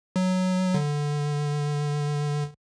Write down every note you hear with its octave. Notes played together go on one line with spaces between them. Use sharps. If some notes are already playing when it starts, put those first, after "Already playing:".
F#3
D3